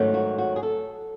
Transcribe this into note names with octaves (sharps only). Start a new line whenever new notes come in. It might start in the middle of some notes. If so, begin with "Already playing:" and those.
Already playing: G#2 D#3 F#3 A3 C#4
F#4
F#4
G#4
A4